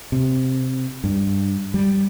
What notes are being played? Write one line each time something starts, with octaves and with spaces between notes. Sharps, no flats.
C3
G2
G3